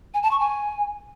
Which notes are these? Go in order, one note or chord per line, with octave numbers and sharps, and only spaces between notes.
G#5
A5
C#6
G#5